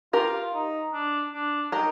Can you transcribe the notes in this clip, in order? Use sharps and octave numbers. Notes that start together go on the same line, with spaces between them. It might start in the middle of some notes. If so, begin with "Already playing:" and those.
F4 G4 A#4
D#4
D4
D4
D#4 G4 A#4